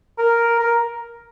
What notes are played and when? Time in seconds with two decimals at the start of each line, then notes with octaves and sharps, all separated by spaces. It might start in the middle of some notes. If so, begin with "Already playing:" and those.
0.18 A#4
0.59 A#4